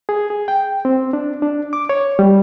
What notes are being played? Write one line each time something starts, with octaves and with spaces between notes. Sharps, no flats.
G#4
G#4
G5
C4
D4
D4
D6
C#5
G3